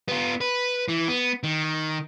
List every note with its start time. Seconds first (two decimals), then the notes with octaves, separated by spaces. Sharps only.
0.09 B3 F4
0.41 B4
0.88 E3
1.08 B3
1.43 D#3